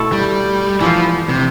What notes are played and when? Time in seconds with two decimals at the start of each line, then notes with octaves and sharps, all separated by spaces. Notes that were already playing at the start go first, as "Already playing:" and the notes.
Already playing: B2 A3 E4 A4
0.12 G3
0.80 E3 F3 B3 F4
1.29 C3